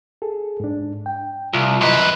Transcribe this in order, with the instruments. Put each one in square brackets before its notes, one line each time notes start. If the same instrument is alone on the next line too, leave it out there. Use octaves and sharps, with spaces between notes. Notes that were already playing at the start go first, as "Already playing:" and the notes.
[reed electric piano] G#4 A4
G#2 D4
G5
[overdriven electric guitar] C2 [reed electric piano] F4
[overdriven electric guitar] F#2 B4 [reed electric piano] D#5 A#5 C6